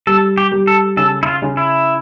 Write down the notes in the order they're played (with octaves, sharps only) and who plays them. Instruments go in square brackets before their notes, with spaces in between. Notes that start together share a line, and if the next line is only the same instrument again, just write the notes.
[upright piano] G3 [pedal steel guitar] A4
[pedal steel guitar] G4
[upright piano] G3
[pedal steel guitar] A4
[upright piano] C#3 [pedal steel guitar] A4
[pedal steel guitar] E4
F4
[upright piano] C#3
[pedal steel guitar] E4